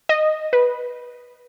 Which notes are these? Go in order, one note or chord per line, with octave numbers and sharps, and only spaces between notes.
D#5
B4